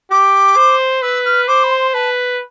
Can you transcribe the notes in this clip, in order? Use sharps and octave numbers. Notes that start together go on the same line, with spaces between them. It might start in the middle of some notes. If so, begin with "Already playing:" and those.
G4 D6
C5
B4 E6
F6
C5 D6
B5
C6
B4 A5